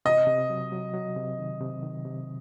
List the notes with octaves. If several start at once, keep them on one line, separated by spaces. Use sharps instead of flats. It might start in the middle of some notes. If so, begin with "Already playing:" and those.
C3 D#5
C3
F#3
F#3
F#3
C3
D#3
C3
D#3
C3